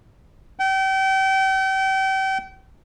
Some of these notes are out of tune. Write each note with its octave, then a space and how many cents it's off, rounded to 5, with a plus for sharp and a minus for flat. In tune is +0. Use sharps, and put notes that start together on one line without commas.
G5 -35